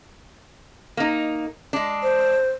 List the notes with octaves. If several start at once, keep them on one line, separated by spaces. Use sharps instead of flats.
A#3 D#4
G#3 D4
C5